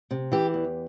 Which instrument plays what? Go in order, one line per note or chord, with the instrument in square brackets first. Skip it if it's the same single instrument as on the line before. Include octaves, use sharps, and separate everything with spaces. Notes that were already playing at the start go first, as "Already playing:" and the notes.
[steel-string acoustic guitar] C3
E3 G4
E2